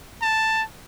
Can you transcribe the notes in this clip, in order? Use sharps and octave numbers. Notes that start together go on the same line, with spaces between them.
A5